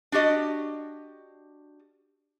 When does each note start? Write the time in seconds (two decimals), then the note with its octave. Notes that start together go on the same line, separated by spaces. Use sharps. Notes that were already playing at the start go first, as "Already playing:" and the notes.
0.12 D4 F#4 G4 D#5